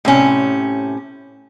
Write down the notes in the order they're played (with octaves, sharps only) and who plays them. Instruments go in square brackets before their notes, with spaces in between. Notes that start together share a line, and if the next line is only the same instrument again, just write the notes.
[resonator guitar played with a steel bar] A2 C3 C#4